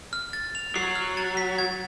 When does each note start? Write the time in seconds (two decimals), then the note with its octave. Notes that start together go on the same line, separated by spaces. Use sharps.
0.13 F6
0.33 A6
0.55 F7
0.76 F#3 C7
0.95 F6
1.17 A6
1.37 B6
1.58 G#6